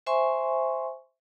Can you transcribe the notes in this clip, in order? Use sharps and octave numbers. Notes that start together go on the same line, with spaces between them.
C5 E5 G#5 C6 C#6